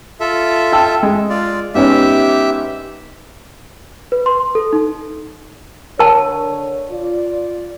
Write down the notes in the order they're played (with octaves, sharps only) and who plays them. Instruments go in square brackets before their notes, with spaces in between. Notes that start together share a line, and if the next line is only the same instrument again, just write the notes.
[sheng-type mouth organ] F4 A4 E5
[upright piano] G5 A5 E6
G#3 G#4
[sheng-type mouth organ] F4 D5
[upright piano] G#2 B3 C#4 [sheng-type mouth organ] G4 E5
[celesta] B4
C6
A4
D#4
[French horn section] D3 C#5 [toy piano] A#4 A5
[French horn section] F4 D5